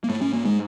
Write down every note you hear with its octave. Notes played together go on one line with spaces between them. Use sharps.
A#3
G#2 A3
C#4
A#3
G#3